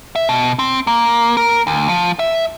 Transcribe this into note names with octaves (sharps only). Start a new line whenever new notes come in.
E5
B2
C4
A#3
A#4
D2
F3
E5